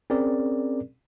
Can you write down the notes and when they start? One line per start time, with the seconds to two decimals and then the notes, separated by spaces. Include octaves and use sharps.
0.10 C4 C#4 G#4 A#4 D5